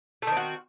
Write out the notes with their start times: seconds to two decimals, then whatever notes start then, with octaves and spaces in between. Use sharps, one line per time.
0.22 A3
0.27 D#3
0.32 C4
0.37 F#4